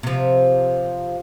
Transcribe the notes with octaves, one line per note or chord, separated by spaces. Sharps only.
C3 F3